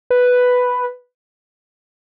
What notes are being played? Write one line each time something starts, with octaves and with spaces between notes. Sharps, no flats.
B4